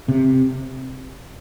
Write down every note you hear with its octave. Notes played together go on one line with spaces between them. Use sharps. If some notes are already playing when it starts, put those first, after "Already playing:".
C3